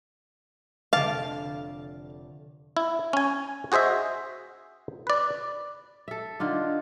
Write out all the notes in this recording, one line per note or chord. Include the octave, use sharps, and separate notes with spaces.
F1 D3 F5 A5 D6
E4
C#4 G#5
F#4 G#4 C5 D#5 E5
B4 D5
A4 E5
D3 D#4 F4 D5